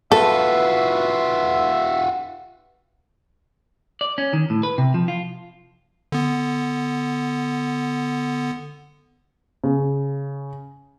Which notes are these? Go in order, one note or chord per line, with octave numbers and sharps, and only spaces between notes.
F4 F#4 A4 B4 E5
D5
C#4
D#3
A2
B4
C3
F3
F4
D3 B3
C#3